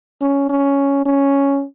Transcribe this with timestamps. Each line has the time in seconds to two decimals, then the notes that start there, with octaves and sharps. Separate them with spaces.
0.21 C#4
0.49 C#4
1.05 C#4